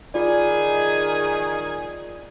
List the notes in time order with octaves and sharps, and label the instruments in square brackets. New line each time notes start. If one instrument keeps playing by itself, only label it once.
[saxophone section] D#3 G#4 [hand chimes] F4 D5